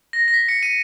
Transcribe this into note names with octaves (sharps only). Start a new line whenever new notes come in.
A#6
A#6
B6
C#7
D#7